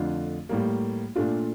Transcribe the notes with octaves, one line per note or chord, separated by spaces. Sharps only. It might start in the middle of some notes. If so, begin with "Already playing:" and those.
Already playing: F2 D3 A3 D4 F4
A2 G3 A#3
A#2 A3 D4 F4